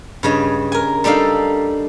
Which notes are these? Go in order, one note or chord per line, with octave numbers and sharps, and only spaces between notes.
G2 C#3 D#5
A#4 G#5
G3 D4 D#4 A4 F5